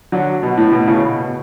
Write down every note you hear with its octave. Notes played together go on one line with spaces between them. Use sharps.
D3 F#3
B2
A2
B2
A2 C#3
B2